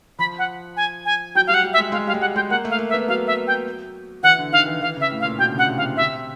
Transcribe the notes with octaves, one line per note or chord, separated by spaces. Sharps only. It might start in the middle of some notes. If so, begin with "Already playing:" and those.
F3 B5
F#5
G#5
G#5
F#3 G5
G3 F5
F#5
G3
E5
G#3
G#3 F5
G3 F5
G#3
G3 F#5
G#3 G5
A#3 F#5
A3
F5
A#3
E5
B3
F#3 F5
E5
G5
E3 F#5
D3
D#3 F5
E3
E3 F5
C#3 E5
A2
F5
A#2
B2 G5
D3
C#3 F#5
C3
F5
C3
C3 E5